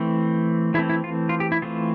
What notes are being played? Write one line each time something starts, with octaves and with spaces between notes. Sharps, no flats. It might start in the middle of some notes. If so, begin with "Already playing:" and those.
Already playing: E3 A3 C4
E3 A3 C4 E4
E4
F4
F4
G4
E4
E3 A3 C4 F4